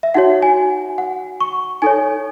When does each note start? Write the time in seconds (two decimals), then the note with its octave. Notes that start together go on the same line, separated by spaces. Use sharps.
0.03 E5
0.14 D#4 F#4 C#5 F#5
0.42 G#5
0.98 F#5
1.40 C#6
1.82 D#4 A4 C#5 G#5